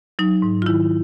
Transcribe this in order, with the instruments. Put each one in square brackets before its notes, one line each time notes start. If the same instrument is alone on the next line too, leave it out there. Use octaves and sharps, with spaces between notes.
[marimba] F#3 D#4
G#2
F4
D#3 E4